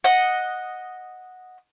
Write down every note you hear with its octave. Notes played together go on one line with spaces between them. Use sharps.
D#5 F#5